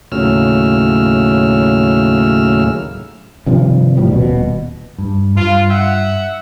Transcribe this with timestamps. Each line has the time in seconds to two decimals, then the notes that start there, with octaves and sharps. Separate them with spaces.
0.12 D#2 A2 C#3 F#3 E6 F6
3.46 G2 C3 D#3 F3
3.97 G1 A2 F3 G3
4.11 D#1 B2
4.98 G2
5.36 G2 F4
5.69 E5 F#5